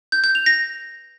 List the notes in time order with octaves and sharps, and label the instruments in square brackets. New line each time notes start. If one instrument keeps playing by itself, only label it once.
[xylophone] G6
G6
F7
A#6